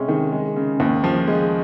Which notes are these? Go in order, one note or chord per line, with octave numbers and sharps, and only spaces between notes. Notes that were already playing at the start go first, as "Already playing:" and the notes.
Already playing: C3 G#3 C#4
D#3
G#3
C#3
D#2
F3
G#3